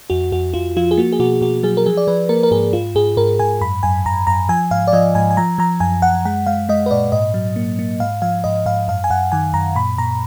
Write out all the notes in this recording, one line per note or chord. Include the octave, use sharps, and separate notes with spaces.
F2 F#4
F2 F#4
F2 F4
F3 F4
G#4
A#3 F#4
G#4
B2 F#4
B2 F#4
F#3 G#4
A#4
F3 G#4
D5
F3 B4
A#3 A#4
A#4
G#2 G#4
G#2 F4
G#2 G#4
G#2 A#4
G#2 G#5
F#2 B5
F#2 G#5
F#2 A#5
F#2 A#5
F3 G#5
G#2 F5
D5
F3 D#5
G#2 G#5
G#5
F3 A#5
F3 A#5
F#2 G#5
F#2 F#5
G#3 F#5
G#3 F5
G#3 D#5
B4
A#2 D5
G#2 D#5
F#3
A#3
A#3
G#2 F5
F3 F5
G#2 D#5
G#2 F5
F#2 F5
G#5
F#2 F#5
D#3 G#5
F#2 A#5
A#2 B5
A#2 A#5